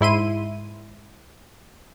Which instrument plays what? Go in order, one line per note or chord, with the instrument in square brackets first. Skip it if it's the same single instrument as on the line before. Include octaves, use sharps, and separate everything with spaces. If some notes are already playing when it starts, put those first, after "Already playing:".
[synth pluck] G#2 E4 C6 D#7